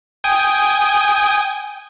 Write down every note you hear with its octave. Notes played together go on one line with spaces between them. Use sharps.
G5 G#5 D#6